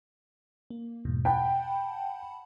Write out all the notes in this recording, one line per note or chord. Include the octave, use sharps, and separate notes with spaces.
A#3
E2 G#2 B2
F#5 G5 A5 B5